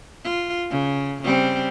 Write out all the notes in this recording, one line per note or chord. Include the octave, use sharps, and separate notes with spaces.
F4
C#3
C#3 G3 C4